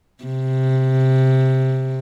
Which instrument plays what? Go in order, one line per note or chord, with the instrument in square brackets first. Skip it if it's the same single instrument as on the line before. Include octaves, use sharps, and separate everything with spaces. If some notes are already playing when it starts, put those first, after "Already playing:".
[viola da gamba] C3